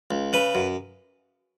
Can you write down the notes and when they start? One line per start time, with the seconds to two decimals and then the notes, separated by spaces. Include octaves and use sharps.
0.11 C#2
0.33 C#3 B4
0.55 F#2